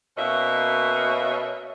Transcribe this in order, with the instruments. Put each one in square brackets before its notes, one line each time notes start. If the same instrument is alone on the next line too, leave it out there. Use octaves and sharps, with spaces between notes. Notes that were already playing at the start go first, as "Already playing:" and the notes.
[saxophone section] B2 A#3 C#4 D#5 E5